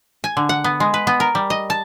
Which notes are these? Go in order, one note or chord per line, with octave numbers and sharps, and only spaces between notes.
G#5
D3
F#5
B3
G#3
B4
B3
A#4
G3
D#5
A5